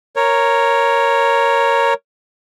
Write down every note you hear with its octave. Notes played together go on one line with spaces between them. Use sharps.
A#4 C#5